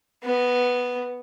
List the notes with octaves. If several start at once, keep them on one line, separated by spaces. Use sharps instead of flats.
B3